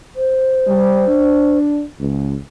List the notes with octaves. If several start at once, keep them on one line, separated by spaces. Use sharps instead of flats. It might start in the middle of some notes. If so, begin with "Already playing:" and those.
C5
G3
D4
C#2